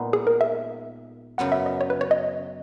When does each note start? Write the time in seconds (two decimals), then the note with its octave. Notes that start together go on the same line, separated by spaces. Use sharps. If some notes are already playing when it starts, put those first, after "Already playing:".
Already playing: A#2 G#3 B3 D#4
0.13 G#4
0.27 A#4
0.41 E5
1.38 F#2 C#3 F#3 B3 F#5
1.52 E5
1.66 D#5
1.81 C#5
1.90 B4
2.01 C#5
2.11 D#5